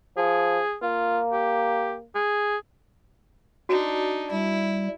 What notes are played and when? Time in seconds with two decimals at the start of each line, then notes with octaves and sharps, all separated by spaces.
0.17 F3 G#4
0.82 A#3 F4
1.32 G4
2.15 G#4
3.69 D4 D#4 F#4
4.31 G3 E4